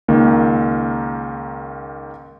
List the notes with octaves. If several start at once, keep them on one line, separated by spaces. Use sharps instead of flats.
C#2 D#3 A#3